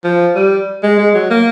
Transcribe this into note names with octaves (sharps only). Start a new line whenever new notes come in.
F3
G3
G#3
G#3
F#3
A#3